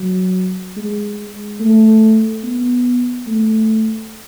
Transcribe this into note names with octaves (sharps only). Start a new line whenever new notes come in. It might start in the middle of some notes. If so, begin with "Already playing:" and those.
Already playing: F#3
G#3
A3
B3
A3